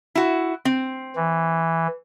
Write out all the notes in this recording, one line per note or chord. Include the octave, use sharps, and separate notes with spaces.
E4 F#4
C4
E3